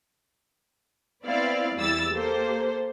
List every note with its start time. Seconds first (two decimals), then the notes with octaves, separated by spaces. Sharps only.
1.25 B3 C4 E4 D5 F5
1.77 E2 G3 E4 D5 E6 A6
2.12 A#3 G4 A4 C5